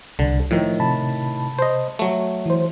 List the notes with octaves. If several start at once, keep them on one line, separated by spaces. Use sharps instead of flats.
C2 D3
A2 D#3 F3
C3 A5 B5
C5 D#5
F#3 A3
E3 C5